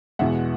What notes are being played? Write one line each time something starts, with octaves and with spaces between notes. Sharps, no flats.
E2 B2 G#3 E5 F#5